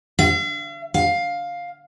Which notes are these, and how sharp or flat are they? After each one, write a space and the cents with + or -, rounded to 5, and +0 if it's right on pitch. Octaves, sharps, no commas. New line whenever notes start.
F5 -45
F5 +10